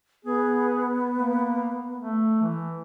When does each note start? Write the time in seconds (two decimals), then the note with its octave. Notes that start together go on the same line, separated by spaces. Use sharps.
0.25 B3 G#4
1.15 A#3
1.97 A3
2.42 E3